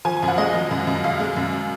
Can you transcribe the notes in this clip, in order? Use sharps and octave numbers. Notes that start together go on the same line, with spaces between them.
F3 G#5
G#5
F#2
F#5
G#3 D#5
F3
F#2
F#2
F#2 F5
G#3
F#2